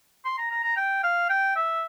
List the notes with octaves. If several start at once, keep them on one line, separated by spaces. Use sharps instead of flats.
C6
A#5
A#5
A#5
G5
F5
G5
E5